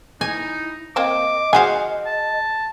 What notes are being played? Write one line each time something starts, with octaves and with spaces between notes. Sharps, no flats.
D#4 E4 G#5
A#3 C4 C5 D#5 D6
F#4 G#4 C5 F5 F#5 G#5
A5